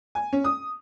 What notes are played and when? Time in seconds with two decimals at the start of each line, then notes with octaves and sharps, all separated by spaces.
0.15 G#5
0.33 C#4
0.44 D#6